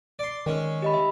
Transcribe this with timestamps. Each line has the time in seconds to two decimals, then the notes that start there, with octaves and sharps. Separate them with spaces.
0.19 D5 C6
0.46 D#3 G#3 C#4
0.82 G4 D#5 B5
0.94 E5